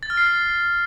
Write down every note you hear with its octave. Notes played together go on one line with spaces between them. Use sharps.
A6
F6
C7